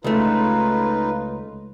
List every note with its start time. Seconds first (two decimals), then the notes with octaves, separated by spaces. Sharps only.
0.04 C#2 A3 D#4 F4 B4